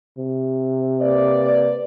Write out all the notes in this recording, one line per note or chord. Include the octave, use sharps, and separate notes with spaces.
C3
A#3 B4 D5